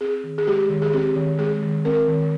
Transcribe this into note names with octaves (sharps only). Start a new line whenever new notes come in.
C4 G#4
D#3
G#4
G#3 G4
D#3
G#4
C4 G4
D#3
G#3 G#4
D#3
C4 A#4
D#3